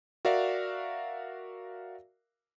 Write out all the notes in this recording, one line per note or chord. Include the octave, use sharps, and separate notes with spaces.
F#4 A#4 D5 E5 F5